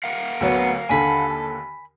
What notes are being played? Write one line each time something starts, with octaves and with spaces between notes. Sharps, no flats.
A#4 F5 F#5
D2 F#3 B3
D#2 D3 A4 G#5 A5 B5